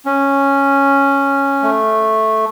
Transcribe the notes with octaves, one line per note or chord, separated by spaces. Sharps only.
C#4
A3